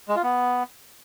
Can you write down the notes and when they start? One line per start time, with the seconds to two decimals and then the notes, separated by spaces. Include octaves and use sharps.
0.09 G#3
0.16 F4
0.23 B3